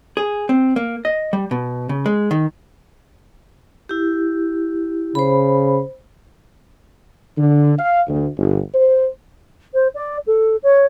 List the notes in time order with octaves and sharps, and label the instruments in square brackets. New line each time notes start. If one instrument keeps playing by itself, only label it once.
[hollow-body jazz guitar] G#4
C4
A#3
D#5
G3
B2
C#3
G#3
D#3
[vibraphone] E4 G4
[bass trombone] C#3 [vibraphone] C5 B5
[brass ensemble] D3
F5
D2
G1
C5
[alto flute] C5
D5
A4
C#5